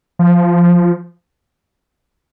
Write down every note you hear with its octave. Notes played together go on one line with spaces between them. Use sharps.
F3